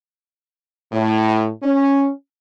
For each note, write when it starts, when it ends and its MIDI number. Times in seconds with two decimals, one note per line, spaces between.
0.92 1.49 45
1.63 2.10 61